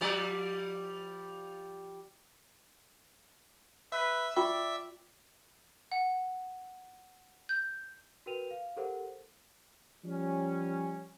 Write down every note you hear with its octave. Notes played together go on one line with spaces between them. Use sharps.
F3 G3 D5
B4 E5
F4 D5 E5 G5 C#6
F#5
G6
F#4 A#4 B4 G5 D#7 F7
F5
G4 A4 A#4 C5 F#5
F3 G3 C#4